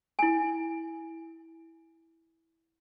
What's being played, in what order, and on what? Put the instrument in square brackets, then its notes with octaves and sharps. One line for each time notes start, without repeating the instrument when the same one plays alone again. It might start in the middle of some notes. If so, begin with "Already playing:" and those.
[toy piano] E4 G#5